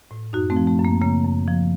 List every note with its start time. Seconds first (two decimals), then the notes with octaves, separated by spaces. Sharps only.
0.11 A2
0.33 F#2 D#4 F#4
0.50 A3 C4
0.56 F3
0.67 A3
0.79 F#2
0.85 A#3
1.01 C#3 A#3
1.25 F#2
1.47 F3